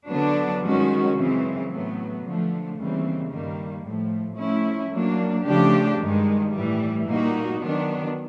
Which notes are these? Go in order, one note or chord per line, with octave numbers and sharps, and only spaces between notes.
D3 F#3 B3 D4
G2 D#3 G#3 C#4 F#4
F#2 C#3 E3 G#3 C4
A2 F#3 B3
D3 F3 A3
D#2 C#3 E3 G3 C4
G2 D#3 G3 A#3
A2 F3 A3
F3 A3 C#4 E4
F#3 A#3 D4
C#3 F3 A3 D4 G4
G2 D#3 G#3
A2 E3 G3
A#2 G3 A#3 D#4 F#4
D#3 F#3 B3 D4